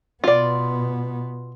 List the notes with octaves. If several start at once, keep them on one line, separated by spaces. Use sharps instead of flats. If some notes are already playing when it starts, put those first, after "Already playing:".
B2 B3 F4 D5